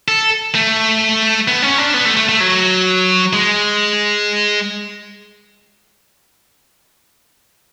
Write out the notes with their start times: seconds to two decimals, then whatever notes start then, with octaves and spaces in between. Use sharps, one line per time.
0.08 A4
0.55 A3
1.48 B3
1.62 C#4
1.78 D4
1.94 B3
2.05 A3
2.17 A3
2.29 A3
2.40 F#3
3.33 G#3